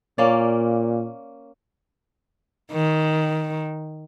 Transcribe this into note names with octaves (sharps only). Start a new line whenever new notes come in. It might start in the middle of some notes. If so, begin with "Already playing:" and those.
A#2 A#3 C#4 D5
D#3